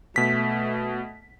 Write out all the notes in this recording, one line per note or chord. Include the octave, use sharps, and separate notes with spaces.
B2 A3 B6